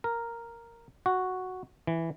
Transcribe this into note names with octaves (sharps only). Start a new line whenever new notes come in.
A#4
F#4
E3